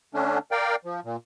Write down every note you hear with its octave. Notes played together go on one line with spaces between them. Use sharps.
D3 A3 C#4 D4
A#4 D5 F5 G5
F3
A#2